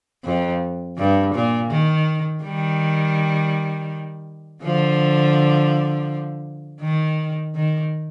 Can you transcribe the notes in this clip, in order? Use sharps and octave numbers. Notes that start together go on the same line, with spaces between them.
F2
G2
A#2
D#3
D#3 G3
D3 F3
D#3
D#3